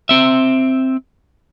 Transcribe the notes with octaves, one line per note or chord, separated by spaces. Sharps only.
C4 E5